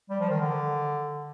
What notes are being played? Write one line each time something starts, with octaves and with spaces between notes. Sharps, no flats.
G3
F3
D#3
D3